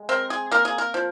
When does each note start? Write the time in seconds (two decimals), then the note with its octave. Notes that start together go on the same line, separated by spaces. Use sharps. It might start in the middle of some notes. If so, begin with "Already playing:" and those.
Already playing: G#3
0.09 C4 A#4
0.30 G#4
0.51 A#3 A#4
0.65 G#4
0.78 A#4
0.94 F3